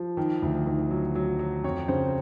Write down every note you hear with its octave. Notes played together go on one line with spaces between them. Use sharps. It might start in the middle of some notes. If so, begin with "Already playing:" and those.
Already playing: F3
D#3
D2
D#3
F#3
F#3
F#3
F2 C#5
C#3 C5